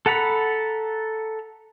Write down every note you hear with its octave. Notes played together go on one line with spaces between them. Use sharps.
A4 F#5 A#5 B5